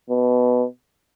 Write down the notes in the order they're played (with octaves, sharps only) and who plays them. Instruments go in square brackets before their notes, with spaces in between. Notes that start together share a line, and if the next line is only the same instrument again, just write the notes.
[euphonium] B2